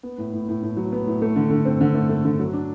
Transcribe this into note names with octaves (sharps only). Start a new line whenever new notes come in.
B3
A2
A2
A2
A2
F#3
B3
A2
A3
D3
D3
C4
D3
A3
A3
D3
F#3
D4